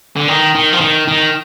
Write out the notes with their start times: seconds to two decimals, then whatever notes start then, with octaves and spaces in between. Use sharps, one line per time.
0.16 D3
0.28 D#3
0.55 D#3
0.73 F3
0.81 D#3
1.08 D#3